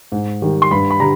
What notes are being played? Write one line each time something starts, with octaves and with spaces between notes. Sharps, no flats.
G#2
D#3 G3
C6
G2 B5
B5
D3 G3 A#5